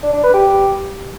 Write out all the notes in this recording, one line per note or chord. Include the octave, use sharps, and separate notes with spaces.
D4
D4
B4
G4